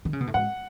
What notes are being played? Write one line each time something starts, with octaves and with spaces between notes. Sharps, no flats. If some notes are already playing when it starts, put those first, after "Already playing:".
D#3
C#3
B2
A2
G#2 F#5